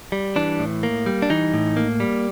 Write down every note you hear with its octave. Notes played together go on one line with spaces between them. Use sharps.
G3
E3 D4
A2
A#3
G3
D4
E3 D#4
A2
A#3
G3